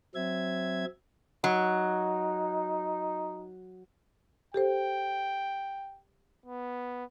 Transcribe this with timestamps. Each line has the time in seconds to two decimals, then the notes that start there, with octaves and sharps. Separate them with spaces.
0.15 F#3 C4 E5 G#6
1.44 F#3 D#4
4.54 G4 A4 C5 G5
6.46 B3